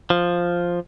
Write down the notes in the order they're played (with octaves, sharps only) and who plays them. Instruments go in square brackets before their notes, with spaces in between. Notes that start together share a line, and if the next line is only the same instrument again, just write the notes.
[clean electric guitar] F3